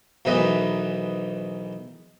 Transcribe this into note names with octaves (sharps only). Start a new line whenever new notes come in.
B1 G#2 D#3 E3 B4 D#5